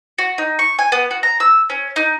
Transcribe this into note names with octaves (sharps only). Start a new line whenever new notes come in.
F#4
D#4
C#6
G#5
B3
F#4
A#5
E6
C#4
D#4